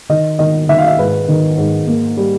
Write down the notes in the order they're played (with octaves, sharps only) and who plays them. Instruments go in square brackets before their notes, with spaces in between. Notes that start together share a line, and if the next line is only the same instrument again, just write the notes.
[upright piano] D#3 D#5
D#3 D#5
D#3 E5
F5
E5
G#2 B4
D#3
G#2
A#3
G3